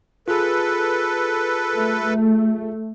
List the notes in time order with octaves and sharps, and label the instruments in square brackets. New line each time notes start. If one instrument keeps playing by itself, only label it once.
[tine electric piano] F4 G#4 [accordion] A4 B4
[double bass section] A3